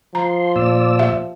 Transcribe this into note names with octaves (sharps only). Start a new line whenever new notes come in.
F3 A#5 C6
A#2 D5 E6
G4 E5 F5